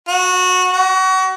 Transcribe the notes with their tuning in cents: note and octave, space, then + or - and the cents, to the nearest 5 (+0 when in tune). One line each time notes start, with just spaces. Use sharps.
F#4 -15
F#4 +30